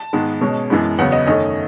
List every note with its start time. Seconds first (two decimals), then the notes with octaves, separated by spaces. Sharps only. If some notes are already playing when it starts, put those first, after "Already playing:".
Already playing: A5
0.13 G#2 D#3 G#3 B3
0.41 B2 G#3 C#4
0.70 F#2 E3 G#3 B3
0.98 E2 C#3 F#3 B3 F#5
1.12 D#5
1.27 F#2 D#3 A3 C#4 D#5